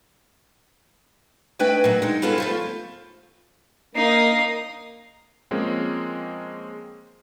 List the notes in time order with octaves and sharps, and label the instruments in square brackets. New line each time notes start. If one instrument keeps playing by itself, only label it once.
[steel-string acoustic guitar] A3 D4 B4 D#5 G5 G#5
A#2 F#3
G#3 D#4
B3 C#4 F4 G#4 A4
F3 A3 F4
[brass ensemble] A#3 [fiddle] D#4 D#6 [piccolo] C7
[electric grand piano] F3 G#3 A#3 C4 C#4